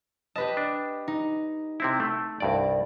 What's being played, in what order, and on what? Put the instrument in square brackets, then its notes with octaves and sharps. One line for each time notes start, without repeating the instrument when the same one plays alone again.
[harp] G4 B4 D#5 [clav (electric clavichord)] A5
[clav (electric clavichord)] D4
[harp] D#4
[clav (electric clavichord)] C3 C4 E4
A3
C2 G2 D5